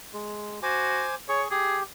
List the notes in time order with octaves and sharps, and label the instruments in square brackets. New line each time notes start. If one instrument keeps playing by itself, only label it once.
[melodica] G#3
[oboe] F#4 [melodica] C5 G#5 D6
[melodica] G#4 C#6 [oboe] C#5
[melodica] G4 [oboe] G#4